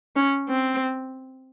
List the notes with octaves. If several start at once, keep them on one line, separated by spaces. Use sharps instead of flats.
C#4
C4